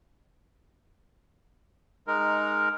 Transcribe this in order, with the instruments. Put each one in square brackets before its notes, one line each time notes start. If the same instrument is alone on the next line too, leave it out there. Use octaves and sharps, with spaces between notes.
[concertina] G#3 D#4 A#4